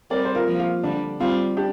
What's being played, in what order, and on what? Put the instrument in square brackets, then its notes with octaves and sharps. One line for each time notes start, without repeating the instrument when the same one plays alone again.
[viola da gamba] G3 C4 [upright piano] A#4 D5
[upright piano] C5
F4 A#4
[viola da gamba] F3 A#3
[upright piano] F4
[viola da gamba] D3 G3 [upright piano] D4
[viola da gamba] G3 C4 [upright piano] F4
[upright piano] D4 G4